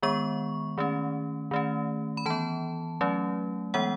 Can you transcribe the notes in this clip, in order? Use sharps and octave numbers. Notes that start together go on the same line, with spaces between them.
D#3 G#3 B3 C#6
D#3 A3 C#4
D#3 A3 C#4
B5
E3 B3 A5
F#3 A3 C#4
E3 G#3 B3 F#5